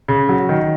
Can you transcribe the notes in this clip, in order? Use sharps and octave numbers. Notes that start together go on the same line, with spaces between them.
C#3
F#3
D#3